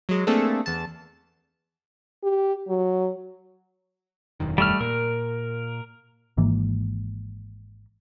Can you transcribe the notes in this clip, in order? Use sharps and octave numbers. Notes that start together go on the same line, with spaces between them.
F#3 G#3
A3 A#3 C4 D4 G#4 A4
E2 A5
G4
F#3
E1 F#2 D#3
G3 A3 F6
A#2 A#4
G#1 G#2 E3 A#3